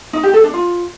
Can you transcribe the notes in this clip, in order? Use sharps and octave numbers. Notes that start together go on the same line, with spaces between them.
D#4
G4
A4
D4
F4